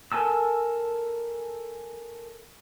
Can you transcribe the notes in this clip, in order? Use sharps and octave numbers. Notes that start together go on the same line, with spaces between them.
A4 A#4 G#5 A5 E6